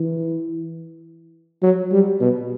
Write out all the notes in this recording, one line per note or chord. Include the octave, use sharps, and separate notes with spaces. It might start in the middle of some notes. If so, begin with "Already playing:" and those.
Already playing: E3
F#3
G3
B2